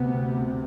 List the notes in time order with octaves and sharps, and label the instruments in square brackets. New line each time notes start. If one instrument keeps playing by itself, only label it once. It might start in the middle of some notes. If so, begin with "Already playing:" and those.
Already playing: [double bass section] D2 C3 B3